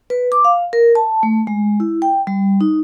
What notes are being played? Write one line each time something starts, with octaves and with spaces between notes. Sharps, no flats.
B4
D6
F5
A#4
A5
A3
G#3
E4
G5
G3
D#4